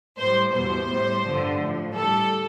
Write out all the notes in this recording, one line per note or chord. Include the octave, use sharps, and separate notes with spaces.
A2 G3 C5
E2 B2 G3 C5
A2 G3
G2 D3 F3
A2 F3
A2 G3 A4